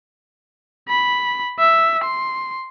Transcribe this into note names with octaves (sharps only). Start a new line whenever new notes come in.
B5
E5
C6